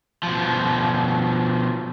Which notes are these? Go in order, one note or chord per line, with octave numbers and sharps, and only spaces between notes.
B2 F3